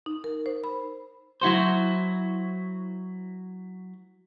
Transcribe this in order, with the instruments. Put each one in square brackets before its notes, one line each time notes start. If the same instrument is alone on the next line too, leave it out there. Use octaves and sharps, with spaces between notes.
[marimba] D#4
A#4
C5
B5
[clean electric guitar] F#3 E4 F#4 C5